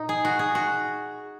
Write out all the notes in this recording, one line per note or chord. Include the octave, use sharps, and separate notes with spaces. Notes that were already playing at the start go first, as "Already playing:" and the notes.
Already playing: A#2 D#4
G#4
F#4
G#4
F#4